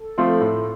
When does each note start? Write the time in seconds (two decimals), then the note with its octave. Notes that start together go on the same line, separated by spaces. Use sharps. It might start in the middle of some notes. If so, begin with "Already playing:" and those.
Already playing: A4
0.18 F3 A3 C4 F4
0.41 A2